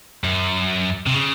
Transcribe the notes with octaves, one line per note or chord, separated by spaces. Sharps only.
F#2
C3
C#3